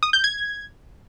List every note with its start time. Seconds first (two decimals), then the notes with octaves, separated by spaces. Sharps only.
0.03 D#6
0.13 G6
0.24 G#6